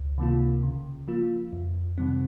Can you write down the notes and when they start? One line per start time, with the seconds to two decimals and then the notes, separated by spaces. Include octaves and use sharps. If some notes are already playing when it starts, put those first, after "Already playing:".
Already playing: C#2
0.18 C3 D#3 A#3 F4
0.63 C#3
1.08 F3 A#3 F4
1.53 F2
1.98 C3 D#3 G3 C4